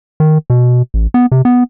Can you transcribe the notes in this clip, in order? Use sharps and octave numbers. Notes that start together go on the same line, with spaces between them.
D#3
B2
A1
B3
C3
B3